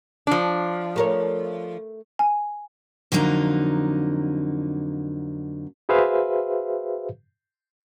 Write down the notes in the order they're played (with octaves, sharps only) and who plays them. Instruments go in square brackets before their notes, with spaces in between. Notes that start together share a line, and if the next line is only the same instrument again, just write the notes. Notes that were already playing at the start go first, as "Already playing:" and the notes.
[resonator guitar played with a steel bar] F3 D4
[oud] A3 A#4 C#5
[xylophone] G#5
[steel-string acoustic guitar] F2 D3 F#3 A#3 D#4 A#5
[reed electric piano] F#4 G#4 B4 C5 E5 F5